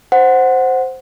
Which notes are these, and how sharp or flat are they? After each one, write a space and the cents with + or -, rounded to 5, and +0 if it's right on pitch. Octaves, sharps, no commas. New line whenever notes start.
C5 +0 F#5 +0